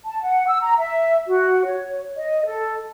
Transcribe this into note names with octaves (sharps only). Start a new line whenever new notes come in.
A5
F#5
E6
A#5
E5
F#4
C#5
D#5
A4